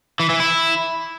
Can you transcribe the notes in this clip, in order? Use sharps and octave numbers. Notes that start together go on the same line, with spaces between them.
E3
E3
E4